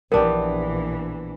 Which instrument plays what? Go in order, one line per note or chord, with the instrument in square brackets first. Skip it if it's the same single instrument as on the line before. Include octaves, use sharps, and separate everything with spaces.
[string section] A#1 E3 [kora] B3 D4 G4 [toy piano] A#4